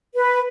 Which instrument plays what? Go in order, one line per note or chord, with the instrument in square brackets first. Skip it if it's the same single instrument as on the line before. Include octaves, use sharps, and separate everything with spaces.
[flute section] B4